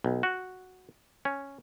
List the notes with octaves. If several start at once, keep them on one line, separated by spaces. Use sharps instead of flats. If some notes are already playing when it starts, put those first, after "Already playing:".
B1
F#4
C#4